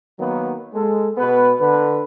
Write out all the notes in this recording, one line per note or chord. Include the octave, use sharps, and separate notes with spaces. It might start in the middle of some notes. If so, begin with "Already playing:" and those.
D#3 F#3 A#3 B3
G#3 A4
B2 B3 B4
D3 B4